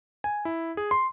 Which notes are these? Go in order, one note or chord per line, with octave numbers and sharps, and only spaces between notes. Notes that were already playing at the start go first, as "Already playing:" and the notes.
G#5
E4
G#4
C6